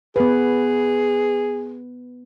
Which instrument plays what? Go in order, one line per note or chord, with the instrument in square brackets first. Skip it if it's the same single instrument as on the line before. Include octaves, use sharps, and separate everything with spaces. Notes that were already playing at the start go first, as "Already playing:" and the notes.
[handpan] B3 B4 [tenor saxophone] G#4